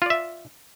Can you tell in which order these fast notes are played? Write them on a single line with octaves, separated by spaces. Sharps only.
F4 D5 E5